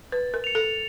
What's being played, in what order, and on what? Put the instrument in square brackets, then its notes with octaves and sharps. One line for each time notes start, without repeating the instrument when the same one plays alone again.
[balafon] B4 [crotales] A6
[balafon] A#4
[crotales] C#7 F7
[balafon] A4